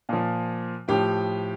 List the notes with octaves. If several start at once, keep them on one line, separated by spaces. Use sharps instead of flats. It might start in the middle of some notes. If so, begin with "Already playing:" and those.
A#2 F3
A2 F3 G4 G5